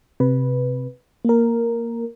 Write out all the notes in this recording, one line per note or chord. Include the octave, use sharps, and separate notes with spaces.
C3 B4
A#3 A#4